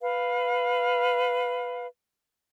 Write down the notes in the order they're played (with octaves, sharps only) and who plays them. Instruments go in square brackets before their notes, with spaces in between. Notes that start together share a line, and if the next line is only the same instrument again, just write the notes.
[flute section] B4 F5